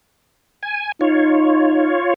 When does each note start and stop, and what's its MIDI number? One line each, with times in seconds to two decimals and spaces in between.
0.63 0.92 80
1.01 1.95 63
1.01 2.14 65
1.01 2.14 73